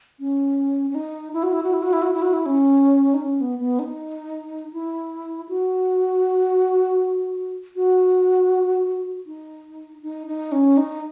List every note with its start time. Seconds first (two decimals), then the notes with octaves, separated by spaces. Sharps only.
0.20 C#4
0.90 C#4
0.95 D#4
1.33 E4
1.43 F#4
1.53 E4
1.63 F#4
1.73 E4
1.83 F#4
1.93 E4
2.02 F#4
2.13 E4
2.22 F#4
2.33 E4
2.46 C#4
3.14 D#4
3.22 C#4
3.41 B3
3.59 B3
3.79 D#4
4.73 E4
5.49 F#4
7.76 F#4
9.27 D#4
10.02 D#4
10.27 D#4
10.52 C#4
10.77 D#4